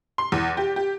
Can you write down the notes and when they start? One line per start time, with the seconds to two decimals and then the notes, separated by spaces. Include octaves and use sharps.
0.18 C6
0.32 E2
0.57 G4
0.76 G4